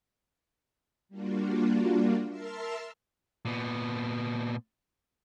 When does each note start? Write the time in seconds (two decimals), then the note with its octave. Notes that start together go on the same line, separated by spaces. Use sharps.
1.09 G3 A#3 D4 F4 F#4
2.28 A#4 E5 A5 C6 E6 F6
3.45 A#2 B3